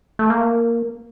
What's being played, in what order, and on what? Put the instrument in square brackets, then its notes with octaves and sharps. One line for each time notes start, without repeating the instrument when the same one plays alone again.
[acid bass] A3
A#3